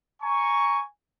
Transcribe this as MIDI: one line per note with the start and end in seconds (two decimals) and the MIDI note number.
0.22 0.82 80
0.22 0.82 82
0.22 0.82 85